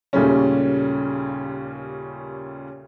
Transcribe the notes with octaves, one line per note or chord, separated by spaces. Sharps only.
D#2 A#2 C#3 G3 A3 C#4